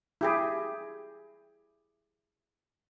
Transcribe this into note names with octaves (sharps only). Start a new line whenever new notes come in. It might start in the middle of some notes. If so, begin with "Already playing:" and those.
E4 G4 G#4